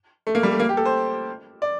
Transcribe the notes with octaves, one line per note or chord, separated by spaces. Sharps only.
A3
A#3
G3
A3
A#3
G4
A4
C5
D5